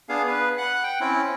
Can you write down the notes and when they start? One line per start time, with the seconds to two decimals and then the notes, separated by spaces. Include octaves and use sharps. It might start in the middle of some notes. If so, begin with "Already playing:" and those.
0.09 B3 D4 G#4 F5
0.28 B4
0.58 F#5 F#6
0.84 G5
1.01 C4 C#4 E4